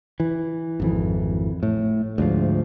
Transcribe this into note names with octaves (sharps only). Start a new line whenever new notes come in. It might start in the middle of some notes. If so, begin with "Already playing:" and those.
E3
G#1 F2 E3
A2
D2 G#2 F3